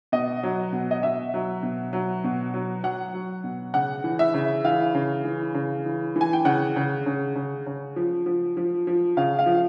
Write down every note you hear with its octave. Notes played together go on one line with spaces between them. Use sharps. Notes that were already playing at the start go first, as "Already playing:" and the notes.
B2 D#5
F#3
B2
D#5
B2 E5
F#3
B2
F#3
B2
F#3
F#3 F#5
F#3
B2
C#3 F#5
E3
E5
C#3
E3 F5
C#3
E3
C#3
E3
E3
G#5
G5
C#3 F#5
C#3
C#3
C#3
C#3
F3
F3
F3
F3
C#3 F5
F5
F3